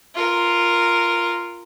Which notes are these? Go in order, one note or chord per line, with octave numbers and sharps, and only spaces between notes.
F4 A#4